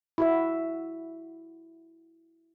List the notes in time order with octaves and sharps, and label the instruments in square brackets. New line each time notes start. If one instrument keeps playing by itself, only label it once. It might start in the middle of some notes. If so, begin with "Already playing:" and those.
[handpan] E4 F#4 E5